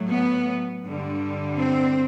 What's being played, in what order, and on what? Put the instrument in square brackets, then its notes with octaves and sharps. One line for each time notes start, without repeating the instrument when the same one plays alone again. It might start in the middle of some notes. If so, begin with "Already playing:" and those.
Already playing: [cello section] A2 F#3 A3
B3
G2 D3 G3
C4